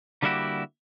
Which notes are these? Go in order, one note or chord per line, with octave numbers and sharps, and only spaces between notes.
D3 G3 A#3 E4 F#4 G4